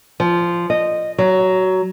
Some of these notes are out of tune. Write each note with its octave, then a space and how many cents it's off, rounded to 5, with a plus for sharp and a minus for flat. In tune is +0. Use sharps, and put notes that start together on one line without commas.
F3 -10
D#5 -15
F#3 +15